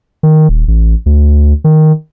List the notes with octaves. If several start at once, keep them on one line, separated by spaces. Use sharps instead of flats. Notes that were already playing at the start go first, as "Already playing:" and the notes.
D#3
D#1
A1
D2
D#3